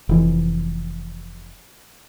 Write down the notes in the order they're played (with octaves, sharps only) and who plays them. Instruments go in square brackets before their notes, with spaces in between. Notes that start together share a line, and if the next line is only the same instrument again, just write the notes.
[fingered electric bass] F1 E3